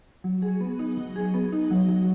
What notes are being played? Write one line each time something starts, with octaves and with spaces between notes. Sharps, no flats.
F#3
G#4
B3
D#4
F#3
G#4
B3
D#4
F#3
F#3